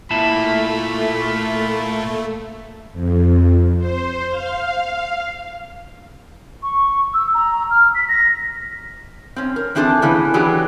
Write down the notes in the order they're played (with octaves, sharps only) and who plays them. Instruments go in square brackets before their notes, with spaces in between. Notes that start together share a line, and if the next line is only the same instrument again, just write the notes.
[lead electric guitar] A#2 A#3 [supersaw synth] A3 [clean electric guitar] E4 A5 [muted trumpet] B5
[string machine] F2
C5
F5
[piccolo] C#6
E6
A#5
F6
B6
A#6
[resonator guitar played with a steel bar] C4 C#4
A#4
E3 C4 D4 G#4 A4
A2 C#3 E3 B3 G#5
E3 F#3 D4 G4 G#4